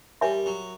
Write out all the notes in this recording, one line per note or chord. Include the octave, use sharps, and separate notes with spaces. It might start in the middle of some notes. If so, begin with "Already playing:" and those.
G3 A#4 C#5 E5 G#5 C6
F#3